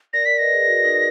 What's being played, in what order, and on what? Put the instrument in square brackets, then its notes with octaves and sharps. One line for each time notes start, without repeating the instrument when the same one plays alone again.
[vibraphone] A#4 D5 [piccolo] A#6
[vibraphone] A#4 D5 [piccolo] B6
[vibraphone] B4 D#5 [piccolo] A#6
[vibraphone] G#4 B4
F#4 A#4
D#4